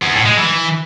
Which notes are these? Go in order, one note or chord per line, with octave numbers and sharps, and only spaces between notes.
E2
A2
G#3
E3